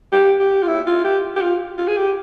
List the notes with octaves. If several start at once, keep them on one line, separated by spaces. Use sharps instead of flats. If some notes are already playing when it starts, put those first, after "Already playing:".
G4
G4
F4
E4
F4
G4
G4
F4
F4
G#4
G4